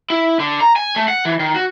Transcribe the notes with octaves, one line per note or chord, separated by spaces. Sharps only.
E4
D3
A#5
G#5
A3
F#5
E3
D#3
F#4